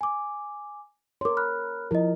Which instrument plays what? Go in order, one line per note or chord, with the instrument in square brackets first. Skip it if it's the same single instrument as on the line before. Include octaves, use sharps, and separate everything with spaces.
[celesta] G#5 D6
[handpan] A#4 C#5 [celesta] C6 D6
[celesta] B5 F6 F#6
[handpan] F3 A#4 [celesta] E4 D#5